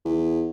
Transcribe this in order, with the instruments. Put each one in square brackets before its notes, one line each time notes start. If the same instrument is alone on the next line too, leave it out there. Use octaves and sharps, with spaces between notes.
[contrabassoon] E2